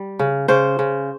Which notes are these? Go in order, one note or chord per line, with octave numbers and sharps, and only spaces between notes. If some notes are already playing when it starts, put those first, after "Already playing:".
Already playing: G3
C#3
C#3 C5
C#3